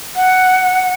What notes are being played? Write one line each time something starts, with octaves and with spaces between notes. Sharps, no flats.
F#5